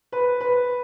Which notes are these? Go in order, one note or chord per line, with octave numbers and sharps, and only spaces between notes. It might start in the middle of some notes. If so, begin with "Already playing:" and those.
B4
B4